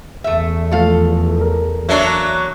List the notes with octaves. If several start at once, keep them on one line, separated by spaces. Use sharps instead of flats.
E2 A3 E5
F3 A3 A4 F5
A#4
F#3 A#3 D4 E5